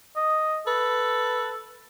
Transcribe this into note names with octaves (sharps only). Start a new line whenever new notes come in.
D#5
A4 B4